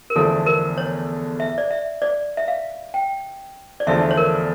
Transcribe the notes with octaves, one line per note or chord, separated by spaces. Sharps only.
A#4
E2 D3 F3 A3 A4
A#4
C#5
E5
D5
E5
D5
E5
F5
G5
D5
E2 D3 F3 A3 D4 E5
C#5
A#4